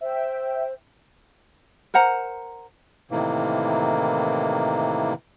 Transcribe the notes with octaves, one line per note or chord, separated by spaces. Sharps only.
C5 E5 G5
A#4 C5 F#5 A#5
A2 C3 D#3 E3 A#3